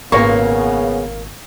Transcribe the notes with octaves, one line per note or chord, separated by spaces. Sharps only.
G#1 A#2 C#3 A#3 B3 C#5 C#6